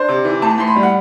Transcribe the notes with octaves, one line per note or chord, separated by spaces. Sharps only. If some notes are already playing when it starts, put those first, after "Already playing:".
Already playing: D4 C5
C3
E3
A2 A5
A2 C6
B5
G3
F#5